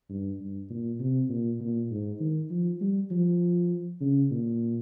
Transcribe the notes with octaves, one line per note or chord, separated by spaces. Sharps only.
G2
G2
A#2
C3
A#2
A#2
G#2
D#3
F3
G3
F3
C#3
A#2